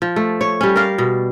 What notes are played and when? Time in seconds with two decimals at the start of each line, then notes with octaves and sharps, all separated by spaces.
0.02 F3
0.16 A3
0.41 C#5
0.61 G3 C#4
0.76 A#4 D5 F5
0.98 B2